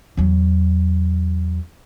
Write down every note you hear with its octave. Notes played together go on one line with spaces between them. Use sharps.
E2 F#3